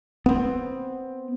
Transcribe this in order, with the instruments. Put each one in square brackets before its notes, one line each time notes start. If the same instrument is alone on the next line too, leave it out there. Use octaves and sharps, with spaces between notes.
[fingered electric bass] B3 C4